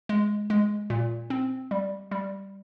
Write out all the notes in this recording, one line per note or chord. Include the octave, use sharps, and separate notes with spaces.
G#3
G#3
A#2
C4
G3
G3